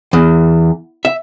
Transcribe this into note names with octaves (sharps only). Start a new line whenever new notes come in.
E2
E5